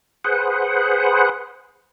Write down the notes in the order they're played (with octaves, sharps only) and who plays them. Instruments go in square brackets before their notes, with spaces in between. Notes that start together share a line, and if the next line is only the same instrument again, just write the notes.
[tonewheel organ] G#4 B4 C5 F#5